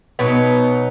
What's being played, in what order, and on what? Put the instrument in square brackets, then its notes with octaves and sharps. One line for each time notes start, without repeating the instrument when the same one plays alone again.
[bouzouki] B2 F#3 B3 D#4